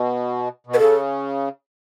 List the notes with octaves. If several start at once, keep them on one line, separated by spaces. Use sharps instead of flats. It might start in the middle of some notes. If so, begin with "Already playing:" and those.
Already playing: B2
B2
B4
C#3 A4